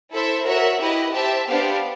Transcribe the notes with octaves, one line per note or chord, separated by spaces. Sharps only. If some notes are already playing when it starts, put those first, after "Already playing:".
E4 A4 C5 E5
F#4 A#4 C#5 E5
E4 G4 B4 D#5
G4 C5 E5 A5
B3 D4 G4 C5 F5